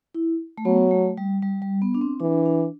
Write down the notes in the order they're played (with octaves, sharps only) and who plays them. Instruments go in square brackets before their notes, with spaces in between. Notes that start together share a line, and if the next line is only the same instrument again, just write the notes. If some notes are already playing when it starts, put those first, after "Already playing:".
[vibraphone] E4
A3
[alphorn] F#3 [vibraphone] B3
[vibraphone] A3
G3
G3
G3
B3
D4
C4
[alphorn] E3 [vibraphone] D4
[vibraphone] D4